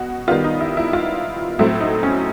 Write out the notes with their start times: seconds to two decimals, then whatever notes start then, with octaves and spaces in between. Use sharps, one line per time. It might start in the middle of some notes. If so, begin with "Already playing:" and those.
Already playing: B2 F#4
0.28 D#3 G3 B3 F4
0.44 D#4
0.61 E4
0.77 E4
0.93 F4
1.59 A2 F#3 A3 C4 E4
1.81 D#4
2.03 C#4